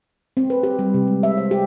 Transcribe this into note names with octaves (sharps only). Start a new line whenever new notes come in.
C4
B4
G4
G3
C3
G#3
E5
C5
G4